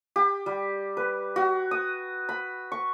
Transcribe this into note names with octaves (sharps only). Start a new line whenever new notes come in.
G4
G3
B4
F#4
D#6
B5
C#6